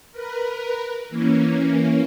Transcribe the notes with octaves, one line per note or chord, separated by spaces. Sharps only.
A#4 B4
E3 A#3 C#4